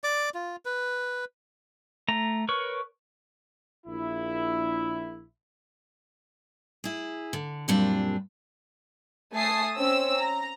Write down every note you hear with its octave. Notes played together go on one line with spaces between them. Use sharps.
D5 D6
F4
B4
A3 A#5
A#4 B4 C#5 C#6
A#1 E4
E4 G#4
D3
F#2 A#2 G3 C4 D4 F4
A3 G#5 A5 D#6 C7
C4 C#4 E6
A#5